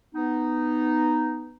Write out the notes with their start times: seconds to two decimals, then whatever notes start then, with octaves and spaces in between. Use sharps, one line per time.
0.15 B3 D#4